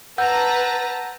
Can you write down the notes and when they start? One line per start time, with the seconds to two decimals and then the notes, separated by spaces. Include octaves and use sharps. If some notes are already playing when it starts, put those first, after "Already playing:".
0.18 B4 F#5 A5 A#5 E6 G6